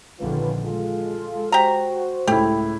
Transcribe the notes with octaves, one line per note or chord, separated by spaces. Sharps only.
A#1 D3 D#3 C#4 F4 B4
G#3 F4 A4
F#4 G4 C5 A#5
C#2 A2 E4 G4